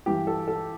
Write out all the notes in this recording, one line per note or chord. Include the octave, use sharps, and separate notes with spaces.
G2 E3 G4
A4
A4